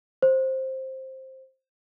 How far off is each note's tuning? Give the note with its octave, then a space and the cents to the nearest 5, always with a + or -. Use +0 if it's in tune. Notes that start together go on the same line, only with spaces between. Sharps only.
C5 +10